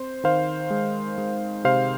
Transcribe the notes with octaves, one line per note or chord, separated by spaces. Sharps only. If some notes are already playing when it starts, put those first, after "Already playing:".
Already playing: C4 C5
D#3 C5 F5
G#3
G#3
C3 C5 F5